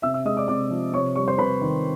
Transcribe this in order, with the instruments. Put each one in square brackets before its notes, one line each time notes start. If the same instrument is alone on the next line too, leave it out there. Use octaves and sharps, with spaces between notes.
[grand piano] C3 E5 E6
E5 E6
G#3 D#5 D#6
D5 D6
C3 D5 D6
F3
C3 C#5 C#6
G3 C#5 C#6
C5 C6
C3 B4 B5
D#3